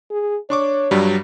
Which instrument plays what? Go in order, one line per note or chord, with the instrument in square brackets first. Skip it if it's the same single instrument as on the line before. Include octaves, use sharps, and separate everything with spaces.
[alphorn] G#4
[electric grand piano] D4 C#6 D6 [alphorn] C#5
[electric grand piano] G2 F#3 G3